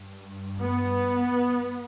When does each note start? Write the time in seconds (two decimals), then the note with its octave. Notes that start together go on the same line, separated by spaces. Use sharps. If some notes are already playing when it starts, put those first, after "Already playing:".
Already playing: G2
0.60 B3